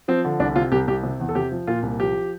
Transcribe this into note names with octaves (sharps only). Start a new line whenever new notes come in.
F3 C4
D3
C2 D4
C3 F4
C2 G4
C2 G4
C3
E2
A4
C3 G4
F3
A#2 F4
C2
F3 G4